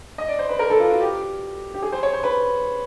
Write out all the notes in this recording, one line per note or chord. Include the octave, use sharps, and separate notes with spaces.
D#5
D5
C5
B4
A#4
A4
F4
F#4
G4
G4
G#4
C5
C#5
C5
B4